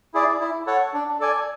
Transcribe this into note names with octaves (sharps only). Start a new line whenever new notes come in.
E4 G#4 D5
E4
A4 C#5 F#5
D4
A4 D5 G#5